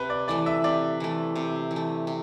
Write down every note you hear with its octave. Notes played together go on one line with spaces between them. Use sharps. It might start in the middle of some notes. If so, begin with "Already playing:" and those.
Already playing: C3 B4
D5
E3 A3 D5
E5
C3 D5
E3 A3
C3
E3
A3
C3